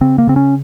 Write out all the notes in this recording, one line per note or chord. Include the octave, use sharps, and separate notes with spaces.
C#3 C4
A#3
C#3 C4
C#4